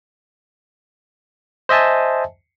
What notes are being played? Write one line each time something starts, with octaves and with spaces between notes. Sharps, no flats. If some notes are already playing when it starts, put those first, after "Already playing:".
C5 D#5 E5 G#5 A5